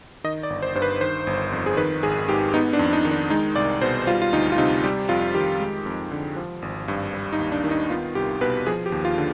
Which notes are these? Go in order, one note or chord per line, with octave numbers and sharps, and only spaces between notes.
D#3 D#5
D5
G1
C5
G2 C5
B4
D#3 C5
G1
F2
G#4
D#3 B4
G#1 G#4
G#2 G4
B3 D#4
D4
F2
D#4
D#3
D4
G#3 D#4
C2 D5
B2 C5
G3 F4
F4
D2 D#4
F4
C3 D#4
G3 G4
F2 F4
D#3 G4
G#3
F2
D3
F3
G#1
G2
G3
D#4
D#2
D4
D#3
D#4
B3 F4
C2 G4
B2 B4
F3 G#4
G4
D#2
F4
D3